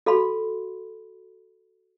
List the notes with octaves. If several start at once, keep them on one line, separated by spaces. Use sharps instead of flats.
F#4 A4 F5 B5 C6